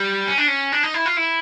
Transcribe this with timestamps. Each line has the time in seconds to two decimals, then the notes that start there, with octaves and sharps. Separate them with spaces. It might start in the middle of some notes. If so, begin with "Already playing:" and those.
Already playing: G3
0.27 C#4
0.38 D4
0.48 C#4
0.72 D4
0.83 D#4
0.94 E4
1.06 F4
1.17 E4